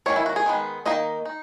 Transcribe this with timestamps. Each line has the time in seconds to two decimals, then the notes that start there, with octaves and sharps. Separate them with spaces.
0.06 D#3 A#3 C#4 C#5
0.16 E4
0.26 F#4
0.36 G#4
0.46 D#3 G#3 B3
0.86 D#3 A#3 D#4 D#5
1.25 D#4